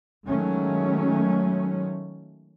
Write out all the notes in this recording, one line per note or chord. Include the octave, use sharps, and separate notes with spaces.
D#3 F#3 G#3 A3 C#4